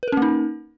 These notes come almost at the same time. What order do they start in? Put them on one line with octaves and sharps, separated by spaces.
B4 A#4 C#4 A#3 D#4